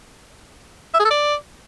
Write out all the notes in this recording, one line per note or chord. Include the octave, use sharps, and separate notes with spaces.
E5
G#4
A4
D5